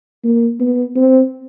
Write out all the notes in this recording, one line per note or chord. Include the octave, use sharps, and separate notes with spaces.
A#3
B3
C4